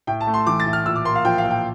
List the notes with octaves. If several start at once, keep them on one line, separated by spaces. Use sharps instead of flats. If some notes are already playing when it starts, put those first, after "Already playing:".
A2 G5
A5
A3
C6
E3 D6
A6
A2
F6
A#2 E6
D6
A#3 C6
F5
F3 G5
F5
A#2
G5